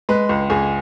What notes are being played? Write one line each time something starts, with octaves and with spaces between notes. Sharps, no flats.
G#3 B4
C#2
C#2 G#4